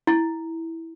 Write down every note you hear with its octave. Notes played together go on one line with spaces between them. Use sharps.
E4